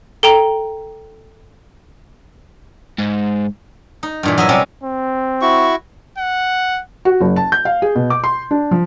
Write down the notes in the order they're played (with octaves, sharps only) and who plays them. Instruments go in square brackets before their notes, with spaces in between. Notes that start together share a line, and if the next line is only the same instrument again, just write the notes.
[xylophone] A4 G5 A#5
[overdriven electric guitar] G#2
[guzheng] D#4
G2 A#2 E3
F#3 D#5 E5
C3 G3 C#4
[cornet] C4
[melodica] E4 F#4 C#6
[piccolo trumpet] F#5
[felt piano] F#4
F#1
A5
G6
F5
G#4
B2
D6
C6
D4
F3